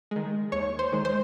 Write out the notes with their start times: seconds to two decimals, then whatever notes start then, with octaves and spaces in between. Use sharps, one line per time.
0.11 D#3 G#3
0.52 D#2 C#5 C#6
0.79 C5 C6
0.93 D#3 G#3
1.05 C5 C6